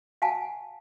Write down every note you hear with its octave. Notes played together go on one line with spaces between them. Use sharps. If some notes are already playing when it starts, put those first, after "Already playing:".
F5 F#5 G#5 A5